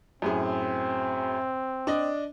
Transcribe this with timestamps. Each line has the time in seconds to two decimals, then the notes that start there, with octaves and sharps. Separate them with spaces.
0.22 F#2 A2 C4 G#4
1.87 D4 D5 D#5